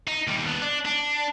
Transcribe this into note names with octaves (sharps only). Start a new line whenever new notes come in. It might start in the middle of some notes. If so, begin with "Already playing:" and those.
D#4
D#2 G3
B3 D4
D4
D4